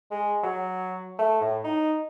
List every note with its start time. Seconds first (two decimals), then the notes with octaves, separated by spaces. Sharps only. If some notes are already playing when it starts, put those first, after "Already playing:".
0.11 G#3
0.43 F#3
1.19 A3
1.41 A2
1.64 D#4